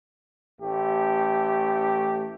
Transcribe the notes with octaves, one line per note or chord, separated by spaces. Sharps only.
A1 A3 G4